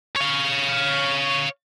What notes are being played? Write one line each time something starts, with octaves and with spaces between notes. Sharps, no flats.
C#5 F5